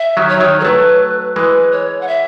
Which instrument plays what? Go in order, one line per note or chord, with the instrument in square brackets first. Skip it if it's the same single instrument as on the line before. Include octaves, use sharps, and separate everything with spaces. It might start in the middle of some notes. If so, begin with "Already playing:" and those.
Already playing: [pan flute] E5
[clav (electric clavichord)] D#3 F#3
[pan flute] C#5
[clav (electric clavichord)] D#3 F#3
[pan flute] A4
[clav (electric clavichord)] F#3 A3 [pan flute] B4
[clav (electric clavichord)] E3 G#3 [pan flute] B4
[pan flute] C#5
F#5
E5